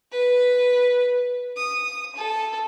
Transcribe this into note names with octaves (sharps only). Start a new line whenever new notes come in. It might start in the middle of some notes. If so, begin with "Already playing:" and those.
B4
D#6
A4